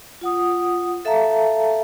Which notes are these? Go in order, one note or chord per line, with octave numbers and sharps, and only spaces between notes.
F4 F#5 D#6
A4 E5 F5 A5 A#5